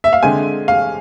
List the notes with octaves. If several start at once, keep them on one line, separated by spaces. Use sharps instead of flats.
E5
F5
D3 G#3 C4 G#5
F5